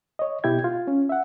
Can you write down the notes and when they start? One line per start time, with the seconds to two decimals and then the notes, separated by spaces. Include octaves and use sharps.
0.19 C#5 D#5
0.44 B2 E4 G4 G5 G#6
0.64 F4
0.87 C#4
1.09 E5 F#5